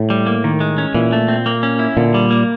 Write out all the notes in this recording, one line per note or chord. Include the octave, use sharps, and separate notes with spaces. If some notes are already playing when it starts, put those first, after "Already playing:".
Already playing: A2
G3
A#3
D#3
G#3
C#4
A#2 E3
A3
C4
A#3
C#4
E4
A#2 D3
G3
A#3